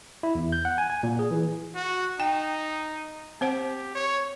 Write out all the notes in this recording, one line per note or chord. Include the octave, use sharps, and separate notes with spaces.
E4
E2
G6
F#5
G#5
G#5
A#2
G#4
E3
F#4
D#4 G5
C4 G4 C5 F#5
C#5